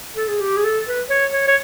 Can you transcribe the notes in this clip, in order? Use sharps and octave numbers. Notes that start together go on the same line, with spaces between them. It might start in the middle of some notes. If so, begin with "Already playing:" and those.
A4
G#4
G4
G#4
A4
B4
C#5
C#5
C#5